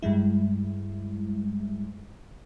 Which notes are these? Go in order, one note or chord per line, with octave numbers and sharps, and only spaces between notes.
G2 G3 G#3 E4